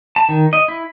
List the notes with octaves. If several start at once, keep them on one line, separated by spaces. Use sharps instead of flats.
A5
D#3
D#5
E4